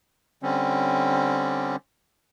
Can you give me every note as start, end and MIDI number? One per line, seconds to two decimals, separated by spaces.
0.43 1.76 50
0.43 1.76 55
0.43 1.76 60
0.43 1.76 61